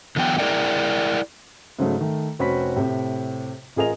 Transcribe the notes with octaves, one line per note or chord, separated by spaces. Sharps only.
D3 E3 F#3 B3 G5
E4 G#4 A#4 D5 G5
G#2 C#3 F#3 A3
D#3 A3
F1 C4 C#4 F#4 B5 B6
A2 C3
A1 F4 G#4 A#4 D#5 F7